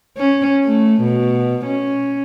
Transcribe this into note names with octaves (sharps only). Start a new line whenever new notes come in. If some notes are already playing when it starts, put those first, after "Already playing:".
C#4
A3
B2
C#4